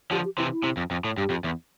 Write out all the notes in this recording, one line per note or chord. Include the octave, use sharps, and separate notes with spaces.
D3 F3 G4
G4
C3 E3 E4
E4
C3
F2
F2
A2
G2 G4
F2
E2